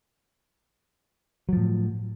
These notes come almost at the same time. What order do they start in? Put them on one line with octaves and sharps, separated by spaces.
F#3 F3 A2